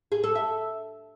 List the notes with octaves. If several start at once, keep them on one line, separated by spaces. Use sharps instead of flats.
G#4
A4
E5